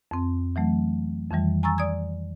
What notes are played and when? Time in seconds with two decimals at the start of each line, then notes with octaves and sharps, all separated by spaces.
0.11 F2 C4
0.56 E3 F#3 A3
1.30 F2 D#3 E3 G3
1.63 G#5 A#5 C#6 E6 A6
1.78 D5 D#6 G#6